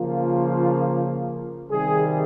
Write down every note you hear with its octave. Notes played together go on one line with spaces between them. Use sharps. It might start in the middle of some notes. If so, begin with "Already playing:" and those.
Already playing: C#3 F3 A#3 F4
C3 D#3 G3 G#4